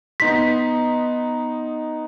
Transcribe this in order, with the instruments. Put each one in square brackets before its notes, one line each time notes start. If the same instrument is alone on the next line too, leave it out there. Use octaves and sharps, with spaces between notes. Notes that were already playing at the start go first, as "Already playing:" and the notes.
[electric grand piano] B3 D#4 C6 [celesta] B6